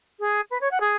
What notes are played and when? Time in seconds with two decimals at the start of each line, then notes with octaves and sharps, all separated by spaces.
0.20 G#4
0.51 B4
0.61 C#5
0.71 F#5
0.80 G#4